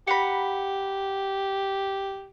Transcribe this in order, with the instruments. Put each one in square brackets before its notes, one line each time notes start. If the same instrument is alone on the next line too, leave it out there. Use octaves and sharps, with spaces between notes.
[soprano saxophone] G4 [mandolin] F#5 A#5 B5